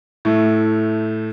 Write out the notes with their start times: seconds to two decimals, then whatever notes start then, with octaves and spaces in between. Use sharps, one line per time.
0.25 A2 A3